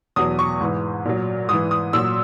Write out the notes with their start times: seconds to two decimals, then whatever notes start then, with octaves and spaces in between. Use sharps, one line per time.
0.16 E2 B2 F#3 D#6
0.39 C#6
0.61 G#2 E3
1.05 A#2 F#3
1.49 G#2 E3 D#6
1.71 D#6
1.93 A#2 F#3 E6